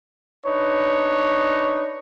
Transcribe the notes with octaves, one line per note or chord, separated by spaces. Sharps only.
D4 D#4 B4 C#5